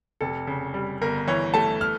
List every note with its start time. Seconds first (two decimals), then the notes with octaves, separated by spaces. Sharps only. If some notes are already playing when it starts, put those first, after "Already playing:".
0.21 F1 A4
0.47 C#3
0.74 G3
1.01 G1 A#4
1.27 E3 C#5
1.54 A3 A5
1.81 F6